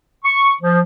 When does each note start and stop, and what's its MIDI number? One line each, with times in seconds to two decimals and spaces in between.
0.24 0.51 85
0.61 0.78 53